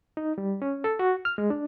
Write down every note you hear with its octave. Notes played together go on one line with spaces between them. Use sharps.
D#4
G3
C#4
A4
F#4
F6
G#3
D4